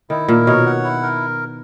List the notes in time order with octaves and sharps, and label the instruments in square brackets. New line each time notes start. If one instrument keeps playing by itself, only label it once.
[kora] D#3 [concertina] E4
[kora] A#2 [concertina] A#4
[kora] B2 [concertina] C#5
[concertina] F#5
E4
A#4